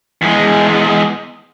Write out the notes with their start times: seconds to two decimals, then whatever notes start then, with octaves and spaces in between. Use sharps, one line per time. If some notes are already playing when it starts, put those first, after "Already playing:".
0.22 E2 G#3